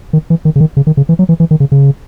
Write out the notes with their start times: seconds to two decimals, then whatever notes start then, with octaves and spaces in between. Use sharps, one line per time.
0.13 D#3
0.30 E3
0.45 D#3
0.56 C#3
0.60 D#3
0.77 C#3
0.87 D#3
0.97 C#3
1.09 E3
1.19 F#3
1.29 E3
1.40 E3
1.51 D#3
1.60 C#3
1.72 C#3